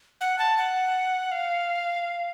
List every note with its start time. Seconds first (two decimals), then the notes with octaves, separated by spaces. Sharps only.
0.21 F#5
0.39 A5
0.57 F#5
1.32 F5